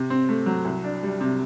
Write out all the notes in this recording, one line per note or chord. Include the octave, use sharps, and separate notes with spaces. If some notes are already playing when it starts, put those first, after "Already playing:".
Already playing: C3
C4
A3
F#3
C2
D4
G3
C3